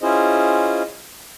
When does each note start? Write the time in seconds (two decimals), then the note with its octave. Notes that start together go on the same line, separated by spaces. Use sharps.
0.02 C#4 E4 F4 G#4 C5 D#5